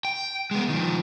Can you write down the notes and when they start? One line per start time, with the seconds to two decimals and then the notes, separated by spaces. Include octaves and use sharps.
0.05 G5
0.51 G#3 B3
0.69 D#3 F3